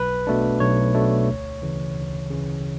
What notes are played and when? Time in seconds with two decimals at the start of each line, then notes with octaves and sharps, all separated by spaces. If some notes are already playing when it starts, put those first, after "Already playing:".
Already playing: B1 B4
0.27 B2 A3 D4
0.60 B1 C#5
0.95 B2 A3 D4
1.28 D2
1.62 C#3 E3
1.96 D2
2.30 C#3 E3